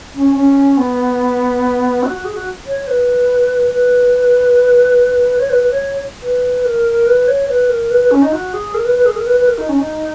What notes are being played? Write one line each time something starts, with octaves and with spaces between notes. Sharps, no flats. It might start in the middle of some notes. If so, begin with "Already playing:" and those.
C#4
C#4
B3
F#4
F#4
G#4
F#4
C#5
B4
B4
C#5
B4
B4
C#5
B4
A#4
B4
C#5
B4
A#4
B4
B4
C#4
D#4
F#4
G#4
A#4
B4
B4
G#4
A#4
B4
B4
A#4
D#4
C#4
D#4